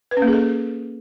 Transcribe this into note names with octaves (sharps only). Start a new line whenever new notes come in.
B4
C#4
A#3
G#4
A4